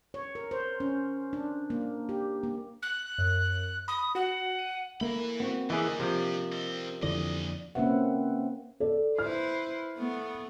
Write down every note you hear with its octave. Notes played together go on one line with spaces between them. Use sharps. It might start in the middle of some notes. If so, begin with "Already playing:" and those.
C#5
A#4
C5
C#4
D4
A#3
G4
A#3
F#6
F#2
B5 D#6
F#4 F#5
D#7
E3 A3 A#3 B5
B3 C4 F#4
E3 D4 G4 G#4 A#4 D#5
C3 F3
G3 C4
F2 A#2 D3 E3 D5 D#5
A#3 C4 C#4 B4 E5 F#5
A4 D5
E4 B4 C5 F6
A3 B3